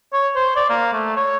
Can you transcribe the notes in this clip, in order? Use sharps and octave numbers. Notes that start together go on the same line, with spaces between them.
C#5
C5
D5
A#3
A3
C#5